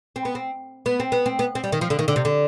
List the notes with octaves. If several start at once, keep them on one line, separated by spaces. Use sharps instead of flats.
C4
B3
C4
B3
C4
B3
C4
B3
C4
G3
D#3
F3
D3
D#3
D3
C3
D3